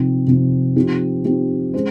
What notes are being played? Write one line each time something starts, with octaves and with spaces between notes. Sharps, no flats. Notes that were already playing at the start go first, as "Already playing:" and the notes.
Already playing: C3 F3 C4 D#4
C3 F3 C4 D#4
F3 C4 D#4 G4
F3 C4 D#4 G4
G#3 C#4 G#4 C5